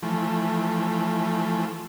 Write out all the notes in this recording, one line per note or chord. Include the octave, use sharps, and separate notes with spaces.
E3 F3 A3